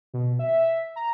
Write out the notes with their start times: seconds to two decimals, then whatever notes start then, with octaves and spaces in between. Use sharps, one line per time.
0.14 B2
0.39 E5
0.96 A#5